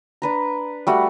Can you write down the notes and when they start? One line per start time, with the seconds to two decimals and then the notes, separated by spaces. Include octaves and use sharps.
0.22 D4 B4 A#5
0.87 G3 A3 F#4